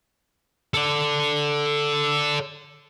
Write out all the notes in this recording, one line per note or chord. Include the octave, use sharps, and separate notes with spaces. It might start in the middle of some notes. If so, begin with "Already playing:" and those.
A4 D5